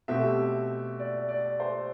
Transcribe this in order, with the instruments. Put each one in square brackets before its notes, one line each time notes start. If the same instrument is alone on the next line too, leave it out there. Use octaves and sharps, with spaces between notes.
[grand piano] B2 A3 C4 G4 [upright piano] E5
[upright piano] D5
D5
C5